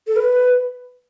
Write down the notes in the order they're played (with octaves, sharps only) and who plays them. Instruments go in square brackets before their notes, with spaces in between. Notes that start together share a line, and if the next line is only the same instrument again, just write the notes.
[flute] A4
B4